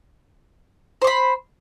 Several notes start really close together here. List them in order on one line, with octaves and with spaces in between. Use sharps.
C5 C#6 B5